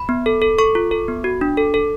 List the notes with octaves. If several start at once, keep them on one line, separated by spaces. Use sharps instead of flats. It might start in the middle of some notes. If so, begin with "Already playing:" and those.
Already playing: B5
B3
A4
A4
A4 C#6
F4
A4
B3
F#4
D4
A4
A4